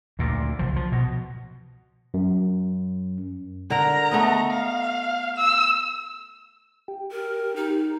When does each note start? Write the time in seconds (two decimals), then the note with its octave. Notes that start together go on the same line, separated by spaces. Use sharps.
0.19 D2 A#2
0.59 C2 F3
0.76 F3
0.92 B2
2.14 F#2
3.70 D3 A#4 A#5
4.11 A3 B3 D#5
4.51 F5
5.36 E6
6.88 G4
7.11 A#4
7.56 D#4